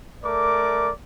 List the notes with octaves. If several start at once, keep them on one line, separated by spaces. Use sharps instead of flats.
A3 A#4 D5 D6